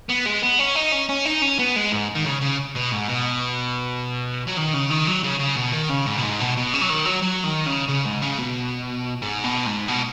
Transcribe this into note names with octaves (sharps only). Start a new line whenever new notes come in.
B3
G#3
B3
C#4
D#4
C#4
C#4
D#4
C#4
B3
G#3
G#2
D#3
C#3
C#3
B2
G#2
B2
F#3
D#3
C#3
D#3
F#3
C#3
C#3
B2
D#3
C#3
G#2
B2
G#2
B2
B2
C#3
F#3
D#3
F#3
F#3
D#3
C#3
C#3
G#2
C#3
B2
G#2
B2
G#2
B2